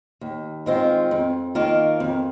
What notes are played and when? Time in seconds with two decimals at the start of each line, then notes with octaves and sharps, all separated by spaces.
0.21 D#2
0.66 D#3 G#3 C4 F4
1.11 F2
1.55 D#3 A#3 F4
2.00 F2